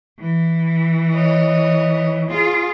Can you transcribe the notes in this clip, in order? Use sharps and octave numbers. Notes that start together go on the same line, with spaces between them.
E3
C#5 D#5
F4 G#4